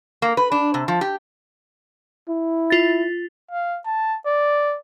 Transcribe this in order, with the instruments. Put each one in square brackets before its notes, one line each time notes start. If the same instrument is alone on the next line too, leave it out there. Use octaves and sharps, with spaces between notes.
[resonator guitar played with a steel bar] A#3
B4
D4
C3
F3
G4
[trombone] E4
[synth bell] F4 A6
[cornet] F5
A5
D5